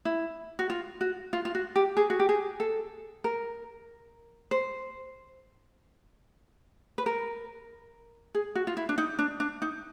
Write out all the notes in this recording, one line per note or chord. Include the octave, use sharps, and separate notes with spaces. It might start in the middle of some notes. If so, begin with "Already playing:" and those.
E4
F#4
F4
F#4
F4
F4
F#4
G4
G#4
F#4
G4
G#4
A4
A#4
C5
B4
A#4
G#4
F#4
F4
E4
D4
D#4
D4
D4
D#4